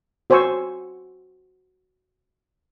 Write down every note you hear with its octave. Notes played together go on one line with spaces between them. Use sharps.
F#4 C5 C#5 G#5 C#6 E6